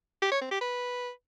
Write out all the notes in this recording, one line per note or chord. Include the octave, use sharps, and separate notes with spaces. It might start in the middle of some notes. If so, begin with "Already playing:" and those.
G4
C#5
C4
G4
B4